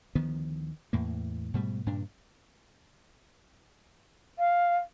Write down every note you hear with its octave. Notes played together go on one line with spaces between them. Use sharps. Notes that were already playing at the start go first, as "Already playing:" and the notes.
D2 D#3 F3 B3
E2 A2 A#3
G#2 B2 G3 A3
G2 A#2 C#3 D4
F5